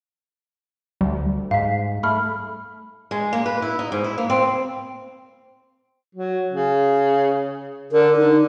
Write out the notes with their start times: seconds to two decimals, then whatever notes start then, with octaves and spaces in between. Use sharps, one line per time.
1.01 D2 G3
1.51 G#2 F5 B6
2.03 A3 B5 F6
3.11 G#3
3.33 A#3
3.46 B4
3.62 E4
3.79 D#4
3.92 G#2
4.04 E4
4.18 A#3
4.30 C4
6.15 F#3
6.52 C#3
7.92 D3 A#4
8.17 D3 D#4